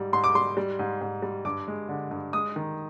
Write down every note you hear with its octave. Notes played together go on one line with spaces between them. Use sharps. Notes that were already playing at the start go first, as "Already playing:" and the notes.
Already playing: G#2 G3
G#2 C6
D6
G3 C6
G3
G#2
G#2
G3
G2 D6
G#3
D3
G2
G#3 D#6
D#3